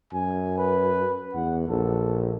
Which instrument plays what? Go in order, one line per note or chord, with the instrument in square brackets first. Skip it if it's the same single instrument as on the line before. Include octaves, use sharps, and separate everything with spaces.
[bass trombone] F#2 [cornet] G#5
[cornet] B4
[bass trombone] E2 [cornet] F#5
[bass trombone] A#1 [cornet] A4